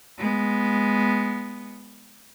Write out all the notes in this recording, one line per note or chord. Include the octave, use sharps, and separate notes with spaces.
G#3 B3